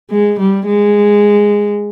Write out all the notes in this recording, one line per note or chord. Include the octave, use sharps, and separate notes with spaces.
G#3
G3
G#3